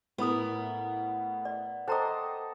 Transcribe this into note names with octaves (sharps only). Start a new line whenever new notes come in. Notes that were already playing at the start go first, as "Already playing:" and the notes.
A2 B3 E4 F4 A#4 B5 D#6
D5
A4 C5 D#5 G5 A5 A#5 C6 D6